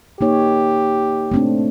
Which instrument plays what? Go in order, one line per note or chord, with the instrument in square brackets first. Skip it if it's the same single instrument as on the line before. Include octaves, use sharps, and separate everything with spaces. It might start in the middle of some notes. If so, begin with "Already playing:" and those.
[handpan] A#3 D#4 C#5 [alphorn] G4
[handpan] A3 C4 D4